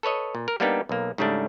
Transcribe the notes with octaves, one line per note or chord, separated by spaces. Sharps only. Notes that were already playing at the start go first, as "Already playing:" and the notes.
A4 B4 C#5 D#5
A#2
A#4
G3 A#3 B3 D4 D#4 G4
B1 A#3
G#2 C#3 G3 A3 D4